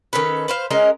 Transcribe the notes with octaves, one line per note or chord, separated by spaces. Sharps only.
D#3 C#4 A4 B4
B4 C5 F5
G#3 C#4 A#4 D#5